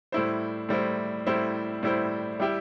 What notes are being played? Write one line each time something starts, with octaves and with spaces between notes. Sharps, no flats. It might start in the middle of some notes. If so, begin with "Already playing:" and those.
A2 G3 E4 C5
A2 G3 E4 C5
A2 G3 E4 C5
A2 G3 E4 C5
G3 E4 G4 E5